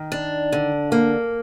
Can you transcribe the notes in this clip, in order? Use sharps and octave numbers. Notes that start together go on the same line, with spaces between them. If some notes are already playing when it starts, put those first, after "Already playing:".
Already playing: D#3
D4
D3
A#3